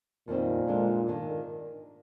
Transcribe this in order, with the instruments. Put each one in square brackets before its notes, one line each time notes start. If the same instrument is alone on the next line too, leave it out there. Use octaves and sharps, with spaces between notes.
[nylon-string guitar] F2 D#3 G3 C4 [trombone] A#2
[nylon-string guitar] D3 G#3 D4 F4
D#3 A#3 D4